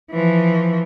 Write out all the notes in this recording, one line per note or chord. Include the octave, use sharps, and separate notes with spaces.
E3 F3